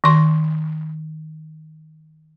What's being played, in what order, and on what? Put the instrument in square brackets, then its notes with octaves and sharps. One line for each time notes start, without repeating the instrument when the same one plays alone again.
[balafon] D#3 C6